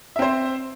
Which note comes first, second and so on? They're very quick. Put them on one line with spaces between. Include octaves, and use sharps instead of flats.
E5 C4 C5